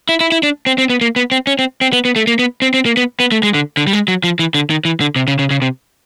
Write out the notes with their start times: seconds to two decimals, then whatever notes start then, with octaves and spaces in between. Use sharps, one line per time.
0.09 E4
0.21 E4
0.32 E4
0.43 D4
0.66 C4
0.78 C4
0.90 B3
1.01 A#3
1.16 B3
1.32 C4
1.47 C#4
1.59 C4
1.81 C4
1.93 B3
2.05 B3
2.16 A3
2.27 A#3
2.39 B3
2.62 C4
2.74 C4
2.86 A#3
2.97 B3
3.20 B3
3.32 A3
3.43 G#3
3.54 D3
3.77 D3
3.87 G3
3.93 G#3
4.08 F#3
4.24 F3
4.39 E3
4.55 D3
4.70 D#3
4.85 E3
5.01 D3
5.16 C3
5.28 C#3
5.39 C#3
5.51 C#3
5.62 C3